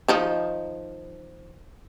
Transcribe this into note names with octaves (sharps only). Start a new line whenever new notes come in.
D#3 F3 D#4